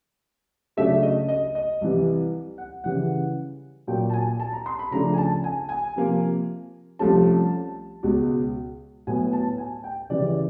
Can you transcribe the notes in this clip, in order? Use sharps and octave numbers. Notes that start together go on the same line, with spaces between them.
C#3 F#3 A3 D4 E5
D#5
D#5
D#5
C2 C3 E3 G3
F#5
C#3 E3 G3 F#5
A#2 F#3 A#3 G5
A5
G#5
A5
A#5
C6
B5
C#3 F3 A3 D4 A#5
G#5
A5
G#5
G#5
C3 F3 A#3
C2 C3 F3 A3 C#4 A5
C#2 B2 G#3
A2 F#3 B3 G#5
A5
G#5
G5
C#3 E3 G3 D5
D5